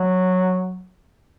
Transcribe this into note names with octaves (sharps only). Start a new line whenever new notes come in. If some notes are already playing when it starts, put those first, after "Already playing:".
Already playing: F#3